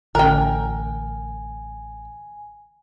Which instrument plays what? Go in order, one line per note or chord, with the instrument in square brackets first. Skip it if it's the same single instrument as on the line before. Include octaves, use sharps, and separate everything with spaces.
[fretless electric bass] A1 [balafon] D3 C#4 [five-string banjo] A#4 G5 [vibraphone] G#5